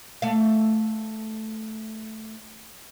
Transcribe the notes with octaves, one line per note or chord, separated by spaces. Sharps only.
A3 F5